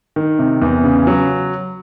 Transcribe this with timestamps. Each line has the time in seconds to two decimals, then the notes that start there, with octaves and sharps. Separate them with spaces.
0.16 D#3
0.39 C3
0.62 E2
0.84 C#3
1.07 F#3